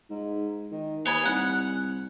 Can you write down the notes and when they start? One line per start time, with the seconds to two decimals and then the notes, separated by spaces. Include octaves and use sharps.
0.10 G#2
0.72 D#3
1.06 D#2 B3 G#5 B5
1.25 C2 F#5